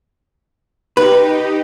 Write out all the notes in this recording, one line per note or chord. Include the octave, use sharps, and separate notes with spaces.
D#4 G4 B4